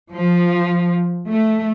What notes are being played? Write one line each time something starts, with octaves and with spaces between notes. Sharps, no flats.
F3
A3